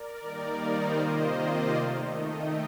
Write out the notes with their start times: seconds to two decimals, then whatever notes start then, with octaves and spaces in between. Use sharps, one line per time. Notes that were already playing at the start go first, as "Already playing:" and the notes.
Already playing: A#4 D5
0.21 D#3 G3 A#3 D#4
0.59 C5 D#5
0.98 C3 D#3 A#3 F4
1.37 D5 F5
1.76 D#3 A3 D#4
2.15 D#5 G5